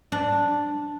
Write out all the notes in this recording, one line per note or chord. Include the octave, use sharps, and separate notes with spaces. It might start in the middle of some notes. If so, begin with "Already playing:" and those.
D4